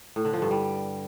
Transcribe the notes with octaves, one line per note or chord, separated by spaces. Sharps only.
A2
D3
F3
G2
G3